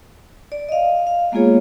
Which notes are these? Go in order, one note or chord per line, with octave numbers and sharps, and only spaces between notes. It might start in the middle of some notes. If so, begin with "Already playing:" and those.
D5
D#5 F5
F5
G#3 A#3 B3 F4 G#4 C#5